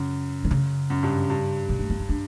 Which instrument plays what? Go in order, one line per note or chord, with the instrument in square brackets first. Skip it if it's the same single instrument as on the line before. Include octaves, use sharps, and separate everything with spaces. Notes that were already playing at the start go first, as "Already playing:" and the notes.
Already playing: [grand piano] F#2 [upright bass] C#3
[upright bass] D3
C#3
[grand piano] F#2
G2
G2
[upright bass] B2
A3
B3
C#4
D4